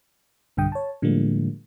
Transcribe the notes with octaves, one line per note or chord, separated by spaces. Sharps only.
B1 G2 D3 G5 D#6
C#5 A5
A2 D3 F3 G3 G#3 A#3